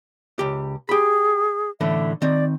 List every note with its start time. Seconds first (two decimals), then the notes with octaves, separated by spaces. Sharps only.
0.39 C#2 G4
0.89 G4 G#4 B5
1.81 A2 D3 E3 E5
2.22 D#3 C4 D5